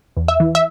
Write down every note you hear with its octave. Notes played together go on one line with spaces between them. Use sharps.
E2
E5
E3
E5